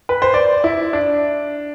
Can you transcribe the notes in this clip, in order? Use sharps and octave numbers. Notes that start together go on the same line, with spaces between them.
B4
C5
D5
E4
D4